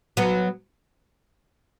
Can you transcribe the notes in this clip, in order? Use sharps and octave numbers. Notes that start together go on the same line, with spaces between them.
F#3 B3